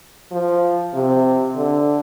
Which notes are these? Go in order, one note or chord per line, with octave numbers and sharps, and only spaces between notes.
F3
C3
D3